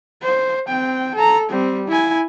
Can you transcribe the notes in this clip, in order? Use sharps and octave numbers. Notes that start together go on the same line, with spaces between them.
C5
C4 G5
A4 A#5
G3 C4
E4 G#5